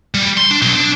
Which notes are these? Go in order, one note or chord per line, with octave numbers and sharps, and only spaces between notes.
G3
C6
D4
B1
D4